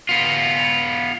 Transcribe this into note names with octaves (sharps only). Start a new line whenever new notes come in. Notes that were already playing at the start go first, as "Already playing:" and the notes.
B3 F4